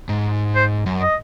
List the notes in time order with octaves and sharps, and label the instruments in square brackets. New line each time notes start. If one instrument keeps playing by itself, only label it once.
[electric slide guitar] G#2
[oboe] C5
[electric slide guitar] F#2
[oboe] D#5